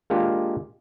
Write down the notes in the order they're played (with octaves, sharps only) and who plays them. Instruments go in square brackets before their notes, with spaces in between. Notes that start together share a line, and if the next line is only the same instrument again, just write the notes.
[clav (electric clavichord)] G#3 A#3 D4 F4 G4